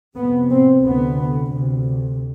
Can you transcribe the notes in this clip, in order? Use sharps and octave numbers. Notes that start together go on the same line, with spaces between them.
F2 C3 B3
C4
D2 C3 B3
D2 C3